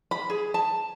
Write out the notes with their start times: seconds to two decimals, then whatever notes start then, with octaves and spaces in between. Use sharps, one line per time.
0.11 B5
0.30 G#4
0.54 A5